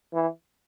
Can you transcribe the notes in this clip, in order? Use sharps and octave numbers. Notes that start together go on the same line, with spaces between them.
E3